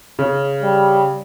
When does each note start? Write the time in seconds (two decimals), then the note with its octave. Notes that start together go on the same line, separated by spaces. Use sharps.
0.19 C#3
0.62 G3